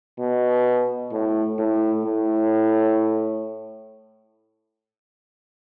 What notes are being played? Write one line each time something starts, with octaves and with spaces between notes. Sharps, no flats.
B2
A2
A2
A2